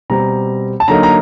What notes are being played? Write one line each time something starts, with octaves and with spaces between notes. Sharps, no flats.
B2 G3 C4 A#5
A5
D3 F#3 A#3 D#4 A#5
A#5